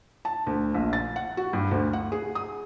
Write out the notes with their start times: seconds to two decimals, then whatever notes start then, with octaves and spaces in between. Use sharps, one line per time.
0.25 A5
0.47 D2
0.74 A#1
0.93 A6
1.16 F#5
1.37 F#4
1.53 G2
1.71 D2
1.93 F#5
2.12 G#4
2.35 D#6